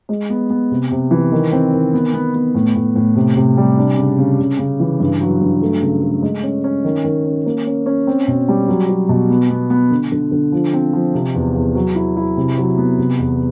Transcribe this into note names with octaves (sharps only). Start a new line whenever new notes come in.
G#3
B3
B3
C3
C3
E3
D#3
C4
D#3
B3
B3
B3
A2
A2
A2
C3
C3
G3
D4
C#3
C#3
C#3
C#3
E3
G2
F#3
G2
A3
C#3
A3
G#3
C#4
C#4
D#3
D#3
C#4
A#3
C#4
C#4
C4
B2
G3
F#3
F#3
B2
B3
B3
B3
D3
D3
D3
F3
C4
F3
C3
E2
E2
F#3
E4
E4
C3
F#3
B3
C3
E2